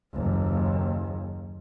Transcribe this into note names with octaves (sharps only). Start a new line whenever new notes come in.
F#1 D#2